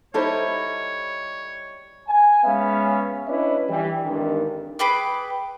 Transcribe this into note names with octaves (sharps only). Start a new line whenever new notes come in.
G3 D#4 E4 A4 C5 C#5
G#5
G#3 B3 C#4 E5 F5
C#4 D4 E4 B4 C#5 D#5
E3 G3
G#1 E2 G2 D3 D#3
G#4 B4 G5 D6